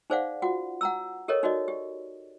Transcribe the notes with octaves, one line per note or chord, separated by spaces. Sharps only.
D#4 G#4 C5 D5 F5 F#5
F4 F#4 F#5
F#5 A#5 E6
G4 A4 A#4 C#5 D#5
D#4 F#4 D5 D#5
G4